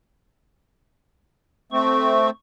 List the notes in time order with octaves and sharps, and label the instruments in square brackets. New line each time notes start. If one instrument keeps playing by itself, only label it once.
[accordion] A3 C4 [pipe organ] C#6